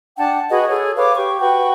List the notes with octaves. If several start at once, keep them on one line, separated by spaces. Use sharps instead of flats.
D4 F#5 G5 A5
F#4 G#4 B4 D#5
G#4 A4 C#5
B4 C#5 F5 D6
G4 C#6
F#4 B4 G5 C#6